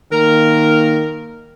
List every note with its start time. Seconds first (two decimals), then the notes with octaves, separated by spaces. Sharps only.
0.12 D#3 A#3 A#4